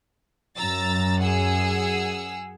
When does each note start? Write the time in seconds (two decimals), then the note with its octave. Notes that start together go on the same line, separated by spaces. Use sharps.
0.58 F#2 A#5 E6 A6
1.21 G#4 F#5 E6